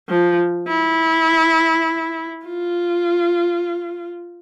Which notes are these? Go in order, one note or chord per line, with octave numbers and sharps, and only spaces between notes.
F3
E4
F4